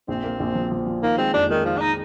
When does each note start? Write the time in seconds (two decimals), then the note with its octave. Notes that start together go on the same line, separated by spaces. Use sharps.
0.08 A#1 C4
0.24 A#3
0.40 A#1
0.55 F3
0.72 F3
0.86 F3
1.03 D#3 A#3
1.18 G#3 C4
1.33 F2 D4
1.50 D#3 G#3
1.65 D#3 F3
1.77 D4
1.81 D#4